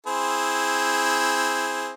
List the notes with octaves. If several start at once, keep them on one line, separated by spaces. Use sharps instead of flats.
C4 E4 G#4